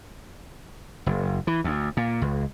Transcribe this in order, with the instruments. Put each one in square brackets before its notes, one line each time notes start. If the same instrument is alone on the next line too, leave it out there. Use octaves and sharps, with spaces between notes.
[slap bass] F#1
E3
D2
A#2
C#2